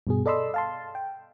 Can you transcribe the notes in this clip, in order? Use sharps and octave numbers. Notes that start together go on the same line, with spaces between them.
G2 B2 G#4
A4 D5 D#5 B5 C6 E6
F5 A5 C6
G5